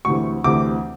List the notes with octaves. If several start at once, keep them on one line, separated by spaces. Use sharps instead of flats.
D2 C3 E3 C#6
D2 C3 E3 D6